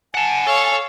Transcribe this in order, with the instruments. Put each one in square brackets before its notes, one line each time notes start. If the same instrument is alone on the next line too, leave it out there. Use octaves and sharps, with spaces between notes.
[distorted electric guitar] F#5 A5 [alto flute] G#5
[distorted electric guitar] A4 [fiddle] C#5 F5